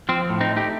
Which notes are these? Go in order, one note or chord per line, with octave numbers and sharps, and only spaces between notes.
F3 C4
A2
C4 D#4
A3
D#4 G4